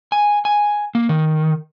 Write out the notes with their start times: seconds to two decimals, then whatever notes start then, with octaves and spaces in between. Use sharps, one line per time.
0.12 G#5
0.45 G#5
0.95 A#3
1.09 D#3